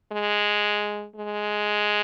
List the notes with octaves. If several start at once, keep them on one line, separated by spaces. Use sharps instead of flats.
G#3
G#3